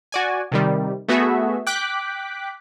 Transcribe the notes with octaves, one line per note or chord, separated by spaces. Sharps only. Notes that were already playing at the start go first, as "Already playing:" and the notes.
F#4 D5 G#5
C3 D#3 G3
A3 B3 F#4 G#4 E5
G5 D6 F#6 B6